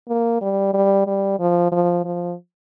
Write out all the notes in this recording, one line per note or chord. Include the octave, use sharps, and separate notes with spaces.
A#3
G3
G3
G3
F3
F3
F3